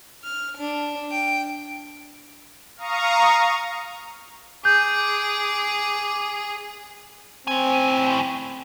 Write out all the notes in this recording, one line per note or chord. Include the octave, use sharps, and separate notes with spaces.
F6
D4
G5
F5 A#5 C#6 D#6
G#4 D6 G6
A2 C4 G#5